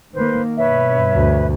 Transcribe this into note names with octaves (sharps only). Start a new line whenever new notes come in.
D#3 A#3 B4 C5
G2 B2 B4 C#5 E5
D2